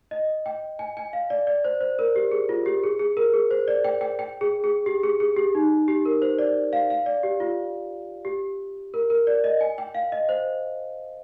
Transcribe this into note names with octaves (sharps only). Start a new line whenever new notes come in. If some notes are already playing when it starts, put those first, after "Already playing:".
D#5
G5
G#5
G#5
F5
D5
D5
C5
C5
A#4
G4
G#4
F4
G4
G#4
G#4
A#4
G#4
C5
D5
G5
G5
G5
G#4
G#4
G4
G#4
G#4
G4
D#4
G4
A#4
C5
D5
F5
F5
D5
G4
F4
G4
A#4
A#4
D5
D#5
G#5
G5
F5
D#5
C5